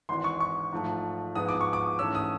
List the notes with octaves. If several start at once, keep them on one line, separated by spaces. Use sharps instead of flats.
G#1 G#2 E3 C6
C#6
C#6
G#2 F3 A3
G#2 F3 G#3 B3 D#6
D6
C#6
D6
G#2 E3 A3 C#4 E6
D#6